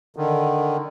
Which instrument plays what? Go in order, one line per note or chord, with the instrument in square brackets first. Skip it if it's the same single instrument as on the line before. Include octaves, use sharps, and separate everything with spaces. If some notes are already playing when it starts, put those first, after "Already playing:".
[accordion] D3 D#3